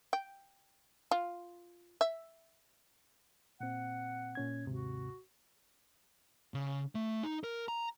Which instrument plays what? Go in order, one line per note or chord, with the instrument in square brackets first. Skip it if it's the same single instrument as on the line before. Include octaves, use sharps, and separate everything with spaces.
[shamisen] G5
F4
E5
[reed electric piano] A#2 C4 [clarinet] F#5
[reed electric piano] A#2 C#4 G#6
[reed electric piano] D#2 G#2 C3 [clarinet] F#4
[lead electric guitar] C#3
A3
D#4
A#4
A#5